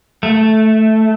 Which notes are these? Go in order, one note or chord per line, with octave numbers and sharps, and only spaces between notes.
A3